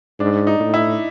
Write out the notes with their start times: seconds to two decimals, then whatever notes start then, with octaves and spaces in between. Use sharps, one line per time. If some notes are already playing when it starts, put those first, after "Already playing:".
0.19 G#2 D4
0.47 D#4
0.60 A2
0.74 E4